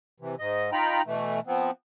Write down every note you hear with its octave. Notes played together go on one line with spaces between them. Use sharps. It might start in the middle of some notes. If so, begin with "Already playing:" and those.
C3 E3
G#2 D#5
D#4 F4 G5 A#5 B5
B2 E3 A3
F3 B3 C4